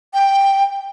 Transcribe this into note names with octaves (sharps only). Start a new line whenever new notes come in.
G5